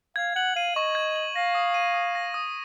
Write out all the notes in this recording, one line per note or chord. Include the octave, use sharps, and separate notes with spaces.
F5 G#6
F#5 F#7
F5 D#7
D#5 C#6
G#6
F#7
F5 A#6
D#6
D#7
D#6
A#6
D#6